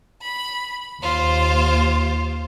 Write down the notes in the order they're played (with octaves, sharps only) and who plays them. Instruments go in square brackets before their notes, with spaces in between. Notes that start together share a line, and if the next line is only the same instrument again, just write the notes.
[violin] B5
[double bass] D#2 [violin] F4 C5